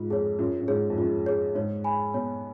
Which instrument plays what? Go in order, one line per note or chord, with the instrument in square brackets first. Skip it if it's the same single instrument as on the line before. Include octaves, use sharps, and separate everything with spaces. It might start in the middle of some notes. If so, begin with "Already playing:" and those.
Already playing: [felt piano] G#2 [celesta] F4
[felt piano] F2 [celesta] G#4 C#5
[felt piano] F#2 [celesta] F4
[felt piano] F#2
[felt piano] G#2 [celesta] G#4 C#5
[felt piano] F2
[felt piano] F#2 [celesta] F4
[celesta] G#4 C#5
[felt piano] G#2 [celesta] C#5
[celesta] G#5 B5
[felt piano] B2 [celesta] C#5